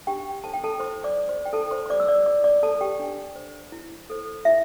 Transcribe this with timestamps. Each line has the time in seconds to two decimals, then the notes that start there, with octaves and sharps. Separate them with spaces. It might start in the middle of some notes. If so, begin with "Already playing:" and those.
0.07 D4 G4 G5
0.43 A4 C5 A5
0.54 G5
0.64 A4 A5
0.80 E4 C5 C6
1.04 D5 D6
1.17 C5
1.29 C5 C6
1.45 G5
1.53 E4 A4 A5
1.71 C5 C6
1.86 C6
1.90 G4 C5 D5 D6
2.00 E6
2.08 D5 D6
2.26 E4 D5 D6
2.44 D5 D6
2.62 A4 C5 A5
2.81 G4 G5
2.99 D4
3.36 C5
3.72 E4
4.10 A4 C5
4.45 E4 E5